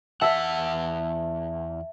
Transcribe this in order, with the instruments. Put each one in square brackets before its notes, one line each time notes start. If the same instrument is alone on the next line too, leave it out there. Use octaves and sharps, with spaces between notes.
[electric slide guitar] E2 F#5 [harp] E5 A5 B6